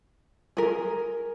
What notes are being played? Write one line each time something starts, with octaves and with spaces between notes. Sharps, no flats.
G#4 A#4